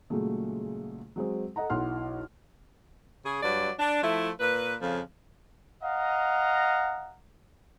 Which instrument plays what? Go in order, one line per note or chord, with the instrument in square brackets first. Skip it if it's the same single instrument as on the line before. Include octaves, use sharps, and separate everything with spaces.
[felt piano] A#2 C#3 F#3 G#3 A3
F#3 G#3 C4
A4 D#5 F#5 A#5
B1 E4 F#5 C6 F6
[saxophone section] C#3 G#4
G2 F#3 D5
D4
F3 A3 E4
A#2 B4
F2 C#3 F3
[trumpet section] D#5 F5 F#5 A#5